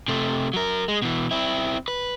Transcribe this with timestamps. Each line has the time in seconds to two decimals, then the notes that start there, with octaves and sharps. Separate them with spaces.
0.08 C3 A3
0.53 F#3 A#4
0.88 G#3
1.02 B2 E3
1.31 C4 E4
1.88 B4